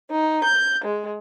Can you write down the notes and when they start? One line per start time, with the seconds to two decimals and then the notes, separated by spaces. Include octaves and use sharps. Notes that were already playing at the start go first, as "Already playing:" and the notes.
0.10 D#4
0.44 G6
0.83 G#3